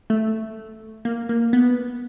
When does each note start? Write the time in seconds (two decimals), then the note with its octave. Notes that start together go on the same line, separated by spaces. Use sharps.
0.10 A3
1.05 A#3
1.29 A#3
1.53 B3